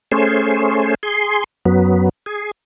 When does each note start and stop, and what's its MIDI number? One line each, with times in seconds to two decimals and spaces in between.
0.12 0.95 57
0.12 0.95 61
0.12 0.95 68
0.12 0.95 72
1.03 1.44 68
1.03 1.44 84
1.65 2.09 42
1.65 2.09 54
1.65 2.09 59
2.26 2.51 68